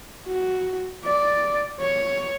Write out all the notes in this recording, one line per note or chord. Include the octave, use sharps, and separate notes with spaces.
F#4
D5
C#5